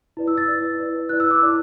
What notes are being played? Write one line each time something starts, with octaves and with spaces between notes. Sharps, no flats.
E4 B4 D5
E6
A6
E4 B4 D5
E4 B4 D5
E4 B4 D5 F#6
E6
D6
E4 D5